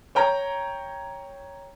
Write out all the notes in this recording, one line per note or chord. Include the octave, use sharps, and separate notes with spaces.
C#5 G5 A#5